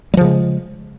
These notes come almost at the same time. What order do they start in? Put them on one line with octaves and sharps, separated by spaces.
G3 F3 C#3 G#3